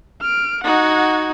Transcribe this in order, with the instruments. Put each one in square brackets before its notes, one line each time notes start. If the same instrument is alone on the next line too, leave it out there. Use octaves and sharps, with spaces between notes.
[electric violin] F6 D7
[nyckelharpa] D#4 F#4 [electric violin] F#5 G#6